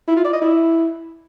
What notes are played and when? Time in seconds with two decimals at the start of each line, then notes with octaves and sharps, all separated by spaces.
0.08 E4
0.16 F4
0.25 D5
0.33 D#5
0.42 E4